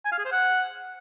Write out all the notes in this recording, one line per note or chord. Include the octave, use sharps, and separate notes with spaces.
G#5
F5
G#4
C5
F#5